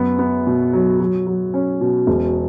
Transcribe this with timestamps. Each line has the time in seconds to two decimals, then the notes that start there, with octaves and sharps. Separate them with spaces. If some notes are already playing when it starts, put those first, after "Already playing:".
Already playing: F#2 B3
0.19 B3
0.47 B2
0.73 F#3
1.00 F#3
1.27 F#3
1.54 C#4
1.81 B2
2.07 E1